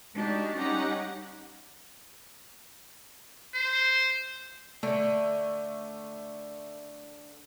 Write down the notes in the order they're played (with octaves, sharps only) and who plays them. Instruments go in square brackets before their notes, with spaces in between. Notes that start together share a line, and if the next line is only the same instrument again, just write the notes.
[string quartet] G#3 D4 D#4 F#4 G4
G3 C#4 D#4 G4 F#5 A#5
[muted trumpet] C5
[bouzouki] D3 [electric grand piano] A3